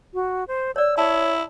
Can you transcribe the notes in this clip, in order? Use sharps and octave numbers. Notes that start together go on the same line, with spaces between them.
F#4
C5
C#5 D5 E6
E4 C#5 A5